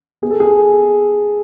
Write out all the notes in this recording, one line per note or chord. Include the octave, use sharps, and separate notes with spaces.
B3 G#4
A4
G#4